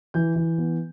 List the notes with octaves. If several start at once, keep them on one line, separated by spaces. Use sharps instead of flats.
E3 G6
E3
B3